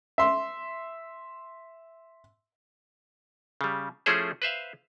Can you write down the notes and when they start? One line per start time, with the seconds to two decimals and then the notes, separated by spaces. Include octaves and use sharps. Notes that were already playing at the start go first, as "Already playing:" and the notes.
0.18 E5 C6
3.61 C#3 G3
4.06 F3 A3 C#4 E4 G#4 C5
4.42 B4 C5 E5 F5